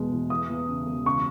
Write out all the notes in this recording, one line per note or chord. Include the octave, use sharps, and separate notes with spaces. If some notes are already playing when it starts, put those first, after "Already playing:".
Already playing: E2 B2 G#3
E2
E3 D#6
E2
C#3
E1
C#2 C#6